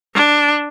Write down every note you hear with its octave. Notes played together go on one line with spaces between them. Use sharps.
D4